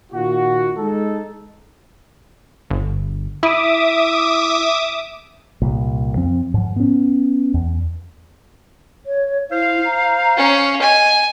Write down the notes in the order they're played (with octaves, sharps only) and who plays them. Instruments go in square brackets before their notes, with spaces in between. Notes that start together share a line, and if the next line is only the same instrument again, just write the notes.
[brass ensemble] A#2 D#3 F4 F#4
G#3 D#4 A4
[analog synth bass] G1
[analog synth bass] E4 [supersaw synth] E5 D6 D#6
[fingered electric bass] C2 A#2
F2 F3 C4
G#2 F3
B3 C#4
E2
[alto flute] C#5
[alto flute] E4 [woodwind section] C5 F5
[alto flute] A#5
[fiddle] C#4
[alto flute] D#5 [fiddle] G#5